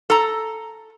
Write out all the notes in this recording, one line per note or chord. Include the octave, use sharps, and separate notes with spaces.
A4 A#5